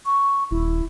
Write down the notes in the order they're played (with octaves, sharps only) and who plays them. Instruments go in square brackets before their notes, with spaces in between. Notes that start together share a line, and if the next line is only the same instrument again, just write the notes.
[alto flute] C#6
[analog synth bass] D#1 [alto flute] E4